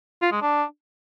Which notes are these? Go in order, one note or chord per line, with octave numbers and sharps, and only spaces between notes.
F4
G#3
D4